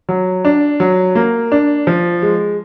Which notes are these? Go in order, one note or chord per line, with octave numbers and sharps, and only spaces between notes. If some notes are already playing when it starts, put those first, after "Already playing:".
F#3
D4
F#3
A#3
D4
F3
G#3